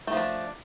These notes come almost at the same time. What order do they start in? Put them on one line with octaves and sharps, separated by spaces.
A3 F3 D4